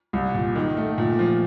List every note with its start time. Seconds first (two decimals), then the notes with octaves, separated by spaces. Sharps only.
0.13 C2
0.34 A#2
0.55 D#3
0.77 A3
0.98 A#2
1.19 F3